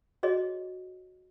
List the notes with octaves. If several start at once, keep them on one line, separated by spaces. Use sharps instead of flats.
F#4 G#4 C#5 D#5